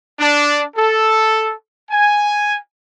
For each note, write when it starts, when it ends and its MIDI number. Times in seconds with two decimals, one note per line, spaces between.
0.19 0.62 62
0.75 1.53 69
1.90 2.57 80